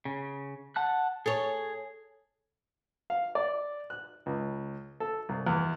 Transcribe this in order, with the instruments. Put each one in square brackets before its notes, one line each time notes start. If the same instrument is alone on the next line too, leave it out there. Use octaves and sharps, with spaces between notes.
[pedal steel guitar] C#3
F#5 A5 F#6
[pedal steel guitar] G#4 [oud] A4 C#5
[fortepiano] F5
D5
F#6
C#2
A4
C2
E2